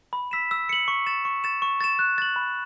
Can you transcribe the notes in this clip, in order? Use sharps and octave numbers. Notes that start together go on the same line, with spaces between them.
B5
E6 B6 E7
E6
C#7 F#7
C#6
A6 E7
C#6
A6 E7
C#6
A6 E7
F#6
A6 F#7
B5